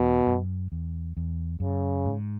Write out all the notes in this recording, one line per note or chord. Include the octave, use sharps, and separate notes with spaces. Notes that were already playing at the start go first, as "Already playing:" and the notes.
Already playing: E2 B2
F#2
E2
E2
F#2 C#3
G#2